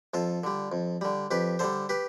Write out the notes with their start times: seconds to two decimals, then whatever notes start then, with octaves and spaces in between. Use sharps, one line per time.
0.14 F2 F4 A4
0.44 D3 G3
0.72 F2
1.01 D3 G3
1.31 F2 G4 B4
1.59 D3 G3 A4 C5
1.89 G4 B4